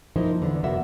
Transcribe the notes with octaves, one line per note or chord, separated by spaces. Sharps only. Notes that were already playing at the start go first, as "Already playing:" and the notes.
F3 A#3 D#4 E4 C5
E2 D3
F2 C3 A#3 B3 F#4 E5